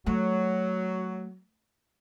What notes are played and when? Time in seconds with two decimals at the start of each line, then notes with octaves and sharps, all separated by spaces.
0.06 F#3 A3